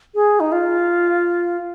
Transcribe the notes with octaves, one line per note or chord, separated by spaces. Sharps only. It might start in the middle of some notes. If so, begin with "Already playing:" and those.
G#4
D#4
F4